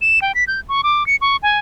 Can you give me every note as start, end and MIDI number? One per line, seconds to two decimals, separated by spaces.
0.01 0.19 100
0.22 0.32 79
0.35 0.44 95
0.47 0.60 91
0.69 0.81 85
0.83 1.06 86
1.06 1.16 97
1.21 1.36 85
1.43 1.59 80